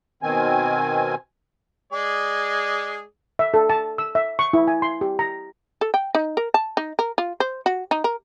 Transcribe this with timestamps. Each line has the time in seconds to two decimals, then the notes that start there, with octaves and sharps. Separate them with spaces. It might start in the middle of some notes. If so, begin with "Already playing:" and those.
0.23 B2 D#3 C4 G#5
1.93 G#3 G#4 D5
3.39 E5
3.54 A4
3.70 A5
3.98 E6
4.15 E5
4.39 C#6
4.53 E4
4.68 G#5
4.82 C6
5.01 G4
5.19 A#5
5.81 A4
5.94 G5
6.15 D#4
6.37 A#4
6.54 A5
6.77 D#4
6.99 A#4
7.18 F4
7.40 C5
7.66 F#4
7.91 D#4
8.04 A#4